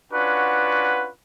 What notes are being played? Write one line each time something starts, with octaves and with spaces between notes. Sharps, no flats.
C#4 D4 F4 F#4 B4 F#5